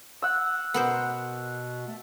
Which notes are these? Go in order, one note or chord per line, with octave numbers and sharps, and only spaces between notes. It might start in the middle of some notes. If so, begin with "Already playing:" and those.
F#5 E6
B2 B3 A#4 C5
A3